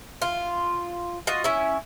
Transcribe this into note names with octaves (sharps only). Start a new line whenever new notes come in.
F4
F4 F#4 D#5
C#4 E4